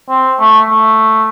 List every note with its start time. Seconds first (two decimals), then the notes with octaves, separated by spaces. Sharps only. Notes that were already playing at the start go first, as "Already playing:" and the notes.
0.09 C4
0.40 A3
0.70 A3